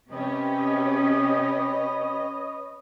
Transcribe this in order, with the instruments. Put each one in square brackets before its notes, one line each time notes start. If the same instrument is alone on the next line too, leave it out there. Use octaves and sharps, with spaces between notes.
[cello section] C3 C#4 G4 [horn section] B4 C#5 D#5